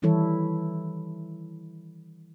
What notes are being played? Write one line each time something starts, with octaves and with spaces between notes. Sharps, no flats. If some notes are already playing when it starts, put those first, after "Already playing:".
D#3 E3 G3 E4 A4 C#5